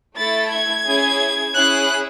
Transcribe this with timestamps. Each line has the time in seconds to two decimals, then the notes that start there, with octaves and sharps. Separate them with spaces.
0.17 A3 E4 A4 A6
0.52 G#6
0.86 C#4 E4 G#4
1.55 C#4 E4 G#4 F#6